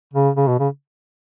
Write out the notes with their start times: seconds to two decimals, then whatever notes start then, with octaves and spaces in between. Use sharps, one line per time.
0.14 C#3
0.37 C#3
0.48 B2
0.60 C#3